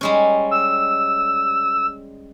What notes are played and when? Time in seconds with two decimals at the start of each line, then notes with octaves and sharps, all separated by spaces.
0.01 G3 G#3 C#4
0.51 E6